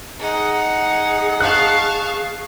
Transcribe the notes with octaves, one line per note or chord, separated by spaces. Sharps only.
D#4 G#4 F#5
F5 A5 C#6 F#6